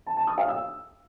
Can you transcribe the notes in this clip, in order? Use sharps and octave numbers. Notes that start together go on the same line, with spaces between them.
A5
A5
D#6
F5
E6